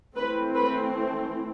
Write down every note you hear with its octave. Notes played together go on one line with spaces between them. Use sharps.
E3 A3 C4 B4
B4